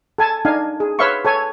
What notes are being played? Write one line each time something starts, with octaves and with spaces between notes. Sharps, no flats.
A4 G#5 A5
D4 D#4 F5 G#5
G#4
B4 C#5 E5 F5 C6 C#6
A4 C#5 G#5